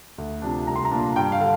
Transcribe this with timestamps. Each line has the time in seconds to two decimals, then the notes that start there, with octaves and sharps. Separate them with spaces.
0.18 D2
0.42 C3 F3 D4
0.67 C2 A#5
0.76 C6
0.85 A#5
0.91 A#2 A#3 D4
1.16 G2 G5
1.32 F5
1.40 D3